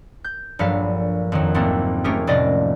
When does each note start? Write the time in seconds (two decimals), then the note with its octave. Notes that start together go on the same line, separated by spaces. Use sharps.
0.24 G6
0.59 A#1 G2 F#3 A4 F5 B6
1.32 F2 D#3 F#3
1.54 C2 G#2 A3 A#3 C4 A4
2.04 A3 A#3 C#4 G4 G#4 A#4
2.27 F1 A2 D5 D#5 F5